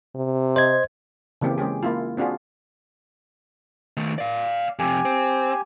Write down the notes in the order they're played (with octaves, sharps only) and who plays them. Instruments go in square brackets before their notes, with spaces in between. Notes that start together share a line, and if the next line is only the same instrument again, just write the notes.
[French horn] C3
[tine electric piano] C5 D#5 G#6
[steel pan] C#3 E3 A#3 C4 G4
G#3 C#4 G4 G#4
A#3 E4 F4
C4 D4 F4 F#4 G#4
[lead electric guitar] D#3 A3
D5 F5
[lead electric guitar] F2 C3 [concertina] G4 G#5
[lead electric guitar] C4